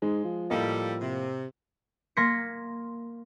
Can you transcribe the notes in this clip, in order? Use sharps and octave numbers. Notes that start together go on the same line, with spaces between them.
G#2 G#3
F3
A2 G3 A#3 A4 D#5
C3
A#3 C6 G#6 A#6 B6 C#7